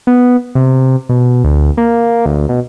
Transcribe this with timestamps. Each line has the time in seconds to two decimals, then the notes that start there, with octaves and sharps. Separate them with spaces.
0.07 B3
0.55 C3
1.09 B2
1.44 D2
1.77 A#3
2.26 D2
2.49 B2